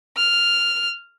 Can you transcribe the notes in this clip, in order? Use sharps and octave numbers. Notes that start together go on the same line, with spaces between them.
F6